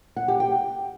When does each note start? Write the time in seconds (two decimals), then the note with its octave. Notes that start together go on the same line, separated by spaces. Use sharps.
0.16 F#5
0.28 G4
0.40 G5